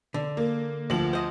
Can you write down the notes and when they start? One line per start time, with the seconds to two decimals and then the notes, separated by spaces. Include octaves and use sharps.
0.14 D3
0.37 A#3
0.90 D2 F3 F#7
1.13 C5 D#5